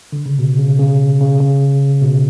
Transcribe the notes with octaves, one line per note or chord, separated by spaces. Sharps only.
D3
C#3
B2
C#3
C#3
C#3
C#3
B2